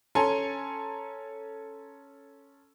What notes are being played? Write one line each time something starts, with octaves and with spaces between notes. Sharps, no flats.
C#4 A4 G#5 A#5 C6